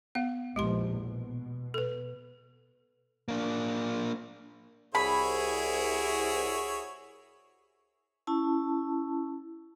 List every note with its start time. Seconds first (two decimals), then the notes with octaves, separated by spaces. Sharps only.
0.15 B3 F5
0.56 A#1 E2 F3 G#3 G4 C6
0.97 B2
1.74 A4 B4
3.28 A#3 D4
4.95 C2 E4 F#4 G#4 C#5 B5
8.27 C#4 E4 A5